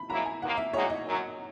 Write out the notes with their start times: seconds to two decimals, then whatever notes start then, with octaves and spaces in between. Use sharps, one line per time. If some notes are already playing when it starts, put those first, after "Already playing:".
Already playing: B5
0.10 G#2 F#3 A#3 E4 A#5
0.26 G#5
0.42 D#2 D#3 A#3 F#5
0.57 E5
0.73 A#2 G#3 D#4 F#4 C#5
0.90 D#5
1.05 F#2 D#3 F#3